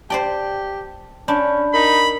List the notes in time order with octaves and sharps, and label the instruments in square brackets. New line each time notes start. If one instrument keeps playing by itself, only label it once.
[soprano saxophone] G4 [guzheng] C5 D5 G5 [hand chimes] A5
[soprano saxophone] C#4 [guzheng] D4 [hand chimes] B5 G6
[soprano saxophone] D#4 [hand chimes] A#4 [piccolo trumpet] B5